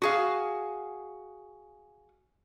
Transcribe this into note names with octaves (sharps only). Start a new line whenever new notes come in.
F#4 G#4 F5